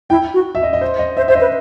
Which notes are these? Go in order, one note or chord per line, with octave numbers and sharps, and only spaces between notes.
E4 G5
F#4
E5
D#5
D#5
C5
D#5
C5 E5
C5 E5
D#5
B4